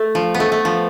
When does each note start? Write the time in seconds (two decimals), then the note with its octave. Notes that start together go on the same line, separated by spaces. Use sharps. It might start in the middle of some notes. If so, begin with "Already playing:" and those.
Already playing: A3
0.15 F3
0.34 B3
0.40 A3
0.52 A3
0.65 F3